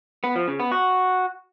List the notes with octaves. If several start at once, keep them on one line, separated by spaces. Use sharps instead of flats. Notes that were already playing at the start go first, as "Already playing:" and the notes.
B3
F3
C#3
B3
F#4